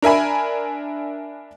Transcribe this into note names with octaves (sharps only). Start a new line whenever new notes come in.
D4 A#4 E5 G#5 B5